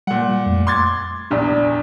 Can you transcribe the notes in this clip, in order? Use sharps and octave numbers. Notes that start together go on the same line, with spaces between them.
A#2 G3 F#5
F2 A3
C6 D6 G#6 A6
A#1 E2 G3 D4 D5